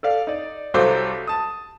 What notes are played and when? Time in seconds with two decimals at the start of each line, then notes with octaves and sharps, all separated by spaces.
0.03 A4 D5 F5
0.27 D#4 D5
0.74 C2 F#3 A4 C5 F5 D6
1.27 A5 D#6